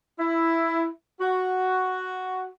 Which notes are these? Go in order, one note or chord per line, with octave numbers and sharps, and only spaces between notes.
E4
F#4